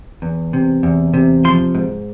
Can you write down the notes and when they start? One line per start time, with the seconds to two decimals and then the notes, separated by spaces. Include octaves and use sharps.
0.22 E2
0.53 C3
0.83 E2
1.14 C3
1.44 F3 C6
1.75 G#2